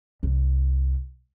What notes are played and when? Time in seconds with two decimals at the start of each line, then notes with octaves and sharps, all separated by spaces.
0.23 C2